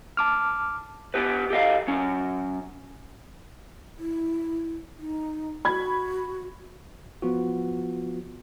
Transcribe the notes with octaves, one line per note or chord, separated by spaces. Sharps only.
A5 D6 F6
B3 G4 B4
G4 A4 D#5 F5
F#3 C#4
E4
D#4
F#4 B5 G#6
F3 B3 F4 F#4